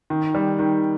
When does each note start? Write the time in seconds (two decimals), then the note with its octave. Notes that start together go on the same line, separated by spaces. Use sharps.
0.10 D#3
0.34 G3
0.59 D#3